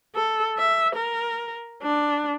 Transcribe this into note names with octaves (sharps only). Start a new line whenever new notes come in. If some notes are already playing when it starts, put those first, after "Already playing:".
A4
E5
A#4
D4